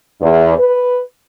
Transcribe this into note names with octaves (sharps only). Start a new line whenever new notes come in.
E2
B4